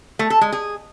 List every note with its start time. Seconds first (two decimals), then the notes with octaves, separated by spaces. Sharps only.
0.19 A3
0.30 A4
0.41 G#3
0.52 G#4